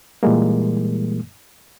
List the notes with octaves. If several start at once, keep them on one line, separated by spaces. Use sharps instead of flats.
A#2 E3 G3 G#3 A#3